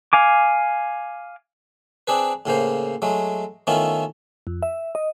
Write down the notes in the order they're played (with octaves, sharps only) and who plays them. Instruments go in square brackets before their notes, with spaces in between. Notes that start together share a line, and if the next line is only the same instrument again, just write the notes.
[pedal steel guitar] F5 G#5 D6
[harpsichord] C4 D4 G#4 B4
A2 C#3 A#3 C5
F#3 G#3 A3
D#3 A3 B3 C#4 E4 F4
[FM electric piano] F2
E5
D#5